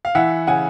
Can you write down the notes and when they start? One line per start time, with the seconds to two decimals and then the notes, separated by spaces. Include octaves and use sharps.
0.05 F5
0.15 E3 E5 F#5
0.47 C#3 F#5 G#5